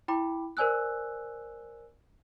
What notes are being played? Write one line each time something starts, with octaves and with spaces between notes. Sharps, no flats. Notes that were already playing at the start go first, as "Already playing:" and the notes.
E4 G5 B5 D6
A#4 C5 D5 G#5 E6 F#6